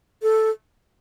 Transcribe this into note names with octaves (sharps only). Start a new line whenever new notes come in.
A4